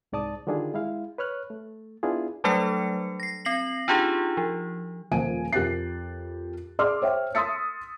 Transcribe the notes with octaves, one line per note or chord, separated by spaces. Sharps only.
C2 G#2 D5 A5 D#6
D3 D#3 G3 D4 F4 G#4
G#3 E4 F5
B4 C#5 F6 F#6
A3
B3 D4 E4 F4 G#4
F#3 G3 A3 D4 A4 C#7
A#6 C7
C4 A#6 C7 F#7
D4 D#4 F4 G4 G#4
F3
D#1 F3 A#3 G#5 D7 D#7
F2 G4 A#4 F#6 A6 C7
G#4 D5 C6 D6 E6 F6
C5 C#5 E5 G5
C6 D#6 E6 A6 B6 C#7